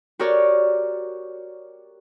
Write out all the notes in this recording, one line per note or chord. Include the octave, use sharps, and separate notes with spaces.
F#4 G4 A#4 C#5 D5 G5